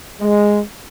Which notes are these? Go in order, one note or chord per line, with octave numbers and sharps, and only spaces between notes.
G#3